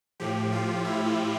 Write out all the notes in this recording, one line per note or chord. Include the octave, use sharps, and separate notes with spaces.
A2 F3 G4
F4
E4